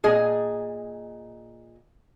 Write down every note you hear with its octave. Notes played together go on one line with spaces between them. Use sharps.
A#2 G#4 D#5